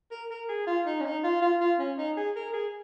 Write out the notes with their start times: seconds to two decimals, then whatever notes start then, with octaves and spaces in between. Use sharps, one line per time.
0.11 A#4
0.31 A#4
0.49 G#4
0.67 F4
0.86 D#4
1.00 C#4
1.05 D#4
1.24 F4
1.42 F4
1.60 F4
1.79 C#4
1.98 D#4
2.17 G#4
2.36 A#4
2.53 G#4